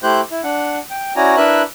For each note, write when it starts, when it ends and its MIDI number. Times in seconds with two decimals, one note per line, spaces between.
0.03 0.21 57
0.03 0.21 64
0.03 0.21 67
0.03 0.21 72
0.03 0.21 90
0.03 0.21 91
0.32 0.41 64
0.44 0.79 62
0.44 0.79 78
0.91 1.13 79
1.16 1.36 61
1.16 1.36 64
1.16 1.36 66
1.16 1.36 74
1.16 1.36 80
1.16 1.36 82
1.37 1.62 62
1.37 1.62 64
1.37 1.62 70
1.37 1.62 71
1.37 1.62 76
1.37 1.62 90